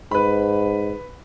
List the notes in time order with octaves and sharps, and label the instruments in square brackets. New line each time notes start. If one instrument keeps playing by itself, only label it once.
[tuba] G#2 [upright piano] B4 B5